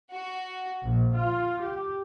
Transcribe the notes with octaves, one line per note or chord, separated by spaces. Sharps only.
F#4
A#1
F4
G4